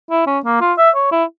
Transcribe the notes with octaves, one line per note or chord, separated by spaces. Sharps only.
E4
C#4
A#3
F4
E5
C#5
E4